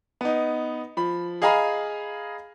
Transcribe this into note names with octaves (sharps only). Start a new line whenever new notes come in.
B3 D#4
F3 B5
G#4 D#5 F5 G#5 A#5 B5